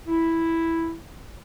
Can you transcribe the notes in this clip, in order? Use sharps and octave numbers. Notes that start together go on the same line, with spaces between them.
E4